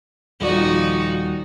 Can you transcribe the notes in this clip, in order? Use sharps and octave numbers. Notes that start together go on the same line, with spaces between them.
D#1 F3 D#4 F#4 D5